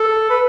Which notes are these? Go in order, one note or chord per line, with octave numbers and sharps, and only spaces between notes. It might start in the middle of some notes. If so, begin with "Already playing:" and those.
Already playing: A4
B4